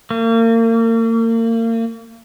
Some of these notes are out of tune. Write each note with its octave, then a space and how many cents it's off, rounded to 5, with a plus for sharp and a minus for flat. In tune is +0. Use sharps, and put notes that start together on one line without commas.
A#3 -35